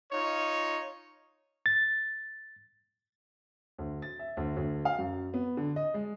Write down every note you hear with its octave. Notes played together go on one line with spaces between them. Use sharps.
D#4 F4 C#5
A6
D2
A6
E5
D2
D2
F5
F#2
B3
D3
D#5
G#3